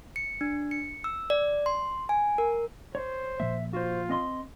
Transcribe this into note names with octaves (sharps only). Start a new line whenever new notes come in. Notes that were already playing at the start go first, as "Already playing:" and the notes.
C#7
D4
C#7
E6
D5
C6
G#5
A#4
C5 C#5
A#2 F3 A#3 E5
F4 F#4 C5
C4 D#5 C6